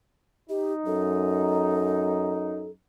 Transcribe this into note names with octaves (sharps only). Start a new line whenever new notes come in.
D#4 G4
F#2 A4